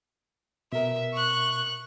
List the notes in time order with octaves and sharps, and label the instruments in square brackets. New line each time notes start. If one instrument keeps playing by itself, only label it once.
[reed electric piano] B2 A#4 [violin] E5
[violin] C#6 F#6